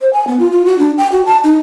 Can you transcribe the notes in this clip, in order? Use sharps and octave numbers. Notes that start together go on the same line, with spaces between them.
C5
G#5
B3
F4
F4
F#4
D4
G5
F#4
A5
D#4